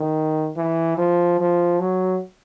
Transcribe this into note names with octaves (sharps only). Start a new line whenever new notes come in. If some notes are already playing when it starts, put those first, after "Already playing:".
Already playing: D#3
E3
F3
F3
F#3